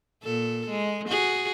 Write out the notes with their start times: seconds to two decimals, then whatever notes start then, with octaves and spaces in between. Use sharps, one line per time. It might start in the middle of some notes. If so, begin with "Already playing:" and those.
0.23 A#2 A4
0.70 G#3
1.09 F#4 G#4